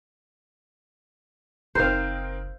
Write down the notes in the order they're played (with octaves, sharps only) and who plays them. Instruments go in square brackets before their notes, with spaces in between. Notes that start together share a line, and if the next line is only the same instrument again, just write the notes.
[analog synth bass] F#1 [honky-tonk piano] C4 D#4 A#4 [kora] C5 F5